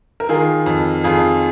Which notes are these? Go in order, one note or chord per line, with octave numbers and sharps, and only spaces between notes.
A#4
D#3 F4 G#4
F2
F2 F4 G#4